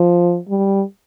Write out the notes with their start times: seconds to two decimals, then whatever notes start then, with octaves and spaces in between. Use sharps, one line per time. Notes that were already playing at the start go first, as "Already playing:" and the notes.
Already playing: F3
0.49 G3